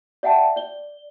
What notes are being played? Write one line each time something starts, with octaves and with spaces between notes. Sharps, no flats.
D5 E5 F#5 G5 A5
D5 G7